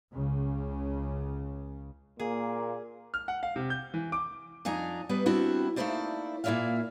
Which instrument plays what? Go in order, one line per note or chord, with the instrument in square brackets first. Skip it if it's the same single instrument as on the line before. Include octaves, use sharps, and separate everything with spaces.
[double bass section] C#2 C#3
[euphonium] A#2 [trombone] A#3 [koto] G#4
[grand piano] F6
F#5
F5
C3
G6
E3
D6
[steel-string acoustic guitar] F2 D4 D#4 G#5 A#5
G3 B3 B4 D#5
G3 B3 C4 D4 E4 F#4
A3 A#3 D#4 E4 C5 D5
A#2 A#3 E4 D5 E5 F5